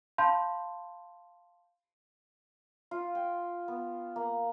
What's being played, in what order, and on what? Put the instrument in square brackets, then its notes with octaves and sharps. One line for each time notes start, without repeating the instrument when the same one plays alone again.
[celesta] F5 A5 B5 C6 G6
[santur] F4
G5
B3
A#3